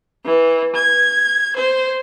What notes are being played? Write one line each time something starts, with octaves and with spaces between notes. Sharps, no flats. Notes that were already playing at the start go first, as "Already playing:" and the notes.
E3
G#6
C5